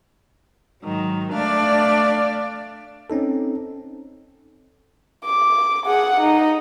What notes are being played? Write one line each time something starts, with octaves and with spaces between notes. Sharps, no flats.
G#2 D#3 F#3
A3 D4 D5 F5
C4 C#4 D#4 A4
D6
G#4 F#5
D#4